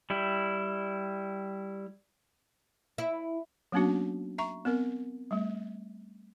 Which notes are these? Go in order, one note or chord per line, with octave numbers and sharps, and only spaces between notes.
G3 E4
E4
F#3 A#3 B3 C#4 D4 F#4
E5 A#5 C#6
B3 C4 A#4
G3 A3